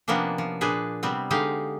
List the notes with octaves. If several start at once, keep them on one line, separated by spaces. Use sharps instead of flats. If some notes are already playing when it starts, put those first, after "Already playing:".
C3 F3 A#3 B3 C#4 D4
F3
A#2 D4 G#4 B4 C5
C3 G3 B3 C4
D3 G#3 D#4 G4 F5